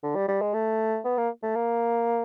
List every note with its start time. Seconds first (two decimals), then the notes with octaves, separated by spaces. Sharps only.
0.03 D3
0.16 G3
0.28 G3
0.41 G#3
0.54 A3
1.05 B3
1.18 A#3
1.43 A3
1.56 A#3